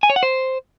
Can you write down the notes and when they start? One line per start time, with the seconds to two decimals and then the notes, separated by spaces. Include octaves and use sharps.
0.03 G#5
0.10 C#5
0.16 F#5
0.23 C5